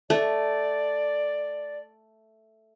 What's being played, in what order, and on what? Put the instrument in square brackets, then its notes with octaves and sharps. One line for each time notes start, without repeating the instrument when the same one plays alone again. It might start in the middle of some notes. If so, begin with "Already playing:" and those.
[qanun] A3 [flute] D5